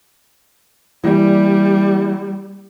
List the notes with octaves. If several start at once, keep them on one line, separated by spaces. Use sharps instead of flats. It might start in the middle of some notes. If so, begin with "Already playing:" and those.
E3 G3 A#3 D5